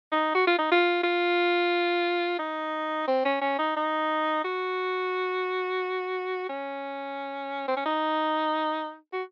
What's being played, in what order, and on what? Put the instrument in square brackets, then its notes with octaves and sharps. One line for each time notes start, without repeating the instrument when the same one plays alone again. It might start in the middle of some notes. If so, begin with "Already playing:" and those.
[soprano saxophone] D#4
F#4
F4
D#4
F4
F4
D#4
C4
C#4
C#4
D#4
D#4
F#4
C#4
C4
C#4
D#4
F#4